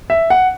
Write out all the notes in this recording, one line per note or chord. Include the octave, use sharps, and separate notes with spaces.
E5
F#5